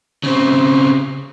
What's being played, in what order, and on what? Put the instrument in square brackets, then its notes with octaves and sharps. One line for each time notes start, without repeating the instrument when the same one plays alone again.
[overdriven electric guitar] C#3 C4